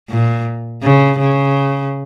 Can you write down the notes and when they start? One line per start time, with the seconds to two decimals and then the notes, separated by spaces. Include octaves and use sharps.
0.10 A#2
0.83 C#3
1.19 C#3